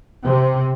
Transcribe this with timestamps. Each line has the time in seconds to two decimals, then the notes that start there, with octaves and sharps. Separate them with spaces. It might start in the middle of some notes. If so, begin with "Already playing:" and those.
0.24 C3